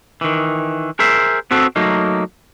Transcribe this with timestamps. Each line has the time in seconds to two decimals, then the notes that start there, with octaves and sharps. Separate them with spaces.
0.21 D#3 E3
0.99 G#4 A#4 C5 E5
1.51 B3 C4 F#4 A4
1.76 F#3 A3 A#3 D#4